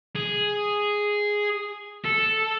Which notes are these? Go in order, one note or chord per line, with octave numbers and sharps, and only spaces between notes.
G#4
A4